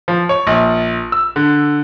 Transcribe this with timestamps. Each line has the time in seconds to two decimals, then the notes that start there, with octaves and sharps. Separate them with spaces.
0.08 F3
0.29 C#5
0.47 A#1
1.12 E6
1.36 D3